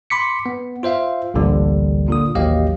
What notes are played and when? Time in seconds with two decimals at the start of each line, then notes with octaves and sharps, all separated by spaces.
0.10 B5 C6 D6 B6 C#7
0.46 B3
0.83 F4 C5 E5 F5
1.34 A1 D2 A#2 D3 G3
2.08 A#2 D3 D#6
2.35 A1 D#2 F#3 G4 D#5 F5